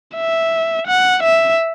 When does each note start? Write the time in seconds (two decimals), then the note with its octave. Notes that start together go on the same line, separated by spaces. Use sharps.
0.16 E5
0.87 F#5
1.22 E5